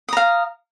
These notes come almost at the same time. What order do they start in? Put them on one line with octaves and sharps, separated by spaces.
D#6 A#5 F5